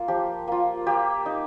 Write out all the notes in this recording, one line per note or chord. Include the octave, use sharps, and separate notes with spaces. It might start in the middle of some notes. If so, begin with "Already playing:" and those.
Already playing: A#3 F4
F3 G4
A#3 F4
A#3 G4
D#4